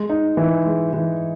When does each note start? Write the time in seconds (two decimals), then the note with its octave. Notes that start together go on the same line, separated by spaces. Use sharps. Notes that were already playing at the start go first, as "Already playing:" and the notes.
Already playing: G#3
0.09 D#4
0.37 E3
0.65 G#3
0.93 E3